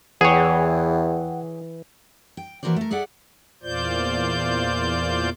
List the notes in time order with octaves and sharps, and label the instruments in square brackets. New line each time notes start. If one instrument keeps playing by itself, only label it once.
[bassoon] E2 [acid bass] E3 [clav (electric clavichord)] G#4 C#5 [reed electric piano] F#5 G5
[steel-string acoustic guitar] G5
E3 A#3 F#4 A#4 C5 D5
A3 A#4
G#4 A4 D5 E5 F#5
[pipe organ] E2 A#2 F4 C5 D5 G6